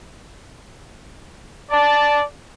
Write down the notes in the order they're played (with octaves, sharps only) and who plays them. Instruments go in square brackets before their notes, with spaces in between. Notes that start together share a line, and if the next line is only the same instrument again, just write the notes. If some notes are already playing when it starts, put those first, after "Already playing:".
[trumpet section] D5 A5